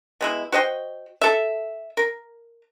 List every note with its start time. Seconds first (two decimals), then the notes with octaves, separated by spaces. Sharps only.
0.21 B2 G#3 E4
0.52 F#4 C5 D#5 G5
1.21 A4 E5
1.97 A#4